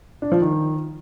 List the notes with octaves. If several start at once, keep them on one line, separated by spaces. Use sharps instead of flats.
D4
F3
D#3